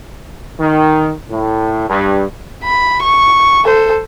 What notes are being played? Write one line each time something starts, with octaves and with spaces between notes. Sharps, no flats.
D#3
A2
G2
B5
C#6
A4 C5